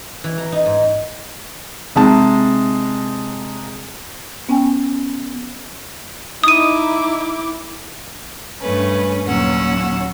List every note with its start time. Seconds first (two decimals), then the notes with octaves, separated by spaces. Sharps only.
0.24 E3
0.38 A#5
0.52 D#4
0.66 G#2
1.96 C3 G#3 D#4 A5
4.49 B3 C#4 G5 G#5
6.44 D#4 E4 D6 D#6 D#7
8.61 G2 A3 C#4 B4
9.24 D#2 A#2 F#3 C#4 F#5 E6